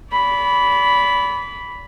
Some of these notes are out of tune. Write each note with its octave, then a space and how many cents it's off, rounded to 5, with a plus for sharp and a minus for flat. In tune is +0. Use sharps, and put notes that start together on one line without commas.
D5 -35 B5 +0